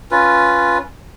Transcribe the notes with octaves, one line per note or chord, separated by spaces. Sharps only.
C#4 F4 B4